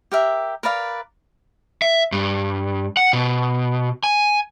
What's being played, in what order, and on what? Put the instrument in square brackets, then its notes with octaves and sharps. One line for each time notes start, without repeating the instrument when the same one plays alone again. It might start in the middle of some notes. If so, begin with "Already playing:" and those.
[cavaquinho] G4 A#4 E5
A#4 B4 D5 F5
[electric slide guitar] E5
G2
F#5
B2
G#5